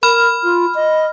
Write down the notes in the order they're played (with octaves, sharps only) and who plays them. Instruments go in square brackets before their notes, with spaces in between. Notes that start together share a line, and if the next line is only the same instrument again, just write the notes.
[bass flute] A#4 [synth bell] B5 F6
[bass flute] F4
D#5